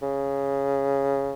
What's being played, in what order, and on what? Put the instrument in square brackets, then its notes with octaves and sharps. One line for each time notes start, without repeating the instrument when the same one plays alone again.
[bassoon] C#3